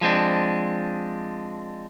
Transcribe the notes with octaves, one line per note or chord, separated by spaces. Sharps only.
F3 G#3 C4 D4